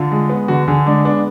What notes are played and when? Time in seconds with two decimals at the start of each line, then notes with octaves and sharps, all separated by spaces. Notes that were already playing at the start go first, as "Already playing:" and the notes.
Already playing: D3 F4
0.11 G#3
0.30 B3
0.48 D3 F#4
0.68 D3 G#4
0.86 G#3 D4
1.05 B3 D4